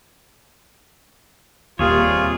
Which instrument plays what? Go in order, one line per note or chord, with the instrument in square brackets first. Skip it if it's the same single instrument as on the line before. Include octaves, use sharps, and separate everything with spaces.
[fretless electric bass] D#1 D#2 [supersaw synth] C3 G3 A#3 [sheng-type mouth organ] F4 [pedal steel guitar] G#4 C#5